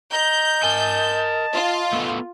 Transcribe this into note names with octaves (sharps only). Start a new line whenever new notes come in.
D#5 A#5 G6
A#4 G#5 A5
F4
A3 B3 A4